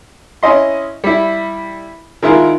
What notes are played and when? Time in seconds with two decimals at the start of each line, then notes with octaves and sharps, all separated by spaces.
0.43 C#4 E4 D#5 C6
1.04 G3 E4
2.23 D#3 G#3 E4 F4 A#4